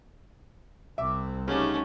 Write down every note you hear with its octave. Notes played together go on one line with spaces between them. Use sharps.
C2 C3 E5 D6
C#3 G3 A3 C#4 D#4 F#4 G4